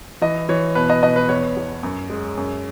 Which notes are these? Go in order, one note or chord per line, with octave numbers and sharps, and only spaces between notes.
E3 D#5
E3 C#5
B2 B4
D#5
B2 D#5
B4
E2 C#5
E2
F#2
G#3
F#2